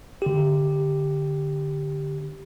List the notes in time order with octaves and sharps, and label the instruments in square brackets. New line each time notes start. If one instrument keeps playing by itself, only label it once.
[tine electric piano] D3 G4